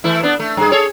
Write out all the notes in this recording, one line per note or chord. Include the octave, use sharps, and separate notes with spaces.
E3 A3 E4
B3 D4
A3
G2 G#4
G#4 A4 C#5